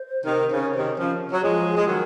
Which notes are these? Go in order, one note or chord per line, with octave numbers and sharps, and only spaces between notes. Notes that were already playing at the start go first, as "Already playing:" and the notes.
Already playing: C5
C3 D#3
C#3
C3 D#3
C#3 F3
F#3
F3 G#3 G#4
G#3
D#3 F#3 A#4